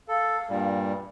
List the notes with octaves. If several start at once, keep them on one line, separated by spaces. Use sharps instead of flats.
A4 F5
G2 A#2 G3